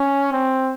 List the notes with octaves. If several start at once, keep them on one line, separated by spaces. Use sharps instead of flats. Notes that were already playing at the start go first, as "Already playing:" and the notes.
Already playing: C#4
C4